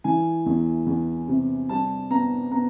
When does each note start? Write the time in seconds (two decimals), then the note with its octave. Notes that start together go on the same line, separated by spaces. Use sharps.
0.04 E3 G#5
0.46 E2
0.86 E2
1.28 C3
1.69 G3 A5
2.10 B3 A#5
2.52 B3 A#5